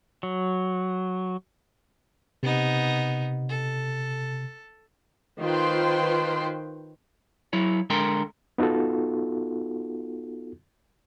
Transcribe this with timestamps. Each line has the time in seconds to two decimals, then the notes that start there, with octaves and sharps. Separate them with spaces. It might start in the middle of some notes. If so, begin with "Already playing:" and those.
0.23 F#3
2.43 C3 B3 D#4
3.49 A4
5.40 D#3 F4 B4 C5 G5 C6
7.53 F#3 E4 C#5
7.90 D3 G#3 A4 A#4 G5 C6
8.58 B3 D#4 F4 F#4 A4